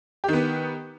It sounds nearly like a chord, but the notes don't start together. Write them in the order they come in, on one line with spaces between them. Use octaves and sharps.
G4 D#3 B3